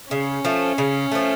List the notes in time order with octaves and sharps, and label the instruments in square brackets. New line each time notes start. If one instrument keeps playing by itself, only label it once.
[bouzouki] C#3 [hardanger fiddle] C#4
[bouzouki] F3 A3
C#3
F3 A3